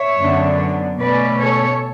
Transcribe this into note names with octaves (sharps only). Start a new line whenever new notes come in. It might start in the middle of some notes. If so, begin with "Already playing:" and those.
Already playing: C#5 E5
F#2 D3 F#3 B3 D4
B2 A3 C#4 B4 D5
A4 C#5